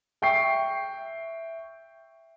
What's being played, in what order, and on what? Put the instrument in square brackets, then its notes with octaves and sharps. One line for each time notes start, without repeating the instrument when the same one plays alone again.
[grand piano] E5 G5 C#6 C7